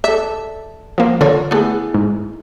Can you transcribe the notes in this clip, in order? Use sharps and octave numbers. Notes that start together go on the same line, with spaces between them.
A4 D5 E5
F3 A#3
D3 F4 A#4 C#5
A3 B3 E4 G#4
G#2